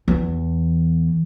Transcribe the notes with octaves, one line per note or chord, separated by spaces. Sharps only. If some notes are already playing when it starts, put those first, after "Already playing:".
E2